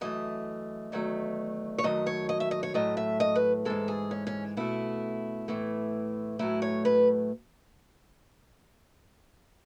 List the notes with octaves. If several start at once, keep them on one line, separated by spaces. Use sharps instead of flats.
F#2 E3 A3 D#5
E2 D#3 F#3 A3
C#5
F#2 D#3 F#3 A3 D#5
C#5
D#5
E5
D#5
C#5
A2 F#3 A3 D#5
E5
D#5
B4
G#2 E3 G#3 A4
G#4
C#4
C#4
B2 A3 E4
A2 E3 A3
A2 F#3 A3 E4
C#5
B4